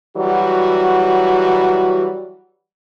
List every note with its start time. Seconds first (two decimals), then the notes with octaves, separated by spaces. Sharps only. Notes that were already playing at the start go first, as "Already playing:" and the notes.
0.17 E3 F#3 G3 F#4